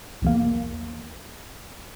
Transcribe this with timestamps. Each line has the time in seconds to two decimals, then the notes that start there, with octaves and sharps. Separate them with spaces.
0.22 B1 E2 A#3